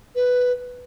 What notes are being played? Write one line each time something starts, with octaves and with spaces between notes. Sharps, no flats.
B4